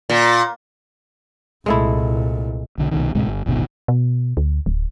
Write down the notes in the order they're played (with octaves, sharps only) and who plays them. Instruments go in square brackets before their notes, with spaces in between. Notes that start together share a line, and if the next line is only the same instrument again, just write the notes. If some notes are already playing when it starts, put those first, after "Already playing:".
[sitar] A#2
[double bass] C2 A#2 [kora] G#3 A3 E4
[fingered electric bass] B1 D3
C2 B2 D#3
D2 A2 C3 G#3
G1
D1 G#1 B2 D#3
[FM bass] B2
D2
D1